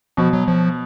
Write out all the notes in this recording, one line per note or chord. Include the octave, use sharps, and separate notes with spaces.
B2 F3
F#3
F3